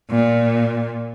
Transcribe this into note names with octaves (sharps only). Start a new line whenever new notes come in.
A#2